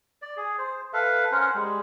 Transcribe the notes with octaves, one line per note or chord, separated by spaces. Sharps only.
D5
G#4
C5
A4 B4 E5 F5
C#4 A#4 C5 F#5
G3 G#3